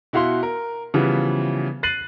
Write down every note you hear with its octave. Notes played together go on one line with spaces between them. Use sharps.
B2 E4 F#4 F5 F#5 C6
A#4
C#3 E3 F3 G3 B3
F#6 A6 C7 D#7 F#7